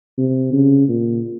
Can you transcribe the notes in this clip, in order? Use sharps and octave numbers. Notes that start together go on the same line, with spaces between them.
C3
C#3
A#2